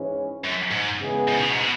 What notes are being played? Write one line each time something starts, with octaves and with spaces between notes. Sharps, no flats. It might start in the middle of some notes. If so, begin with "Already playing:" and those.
Already playing: G#2 E3 G#3 C#4
F#2
G#2
C#3 E3 G#3 B3 G#4
G#2
B2
G#2
B2